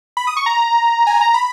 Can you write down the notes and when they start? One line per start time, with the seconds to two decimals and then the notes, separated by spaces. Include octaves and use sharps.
0.17 B5
0.27 D#6
0.37 C#6
0.46 A#5
1.07 G#5
1.21 A#5
1.34 B5